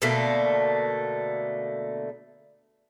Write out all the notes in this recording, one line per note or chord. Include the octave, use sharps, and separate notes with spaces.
B2 D3 A3 A#3